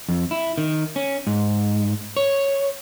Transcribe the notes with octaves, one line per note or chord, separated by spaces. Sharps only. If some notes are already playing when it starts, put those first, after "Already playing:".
F2
E4
D#3
C#4
G#2
C#5